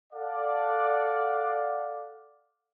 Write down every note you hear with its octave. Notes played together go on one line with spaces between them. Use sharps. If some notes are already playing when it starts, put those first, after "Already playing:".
A4 D5 F5 F#5